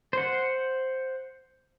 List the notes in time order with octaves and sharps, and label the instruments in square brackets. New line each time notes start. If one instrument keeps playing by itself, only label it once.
[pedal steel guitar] C5 F#5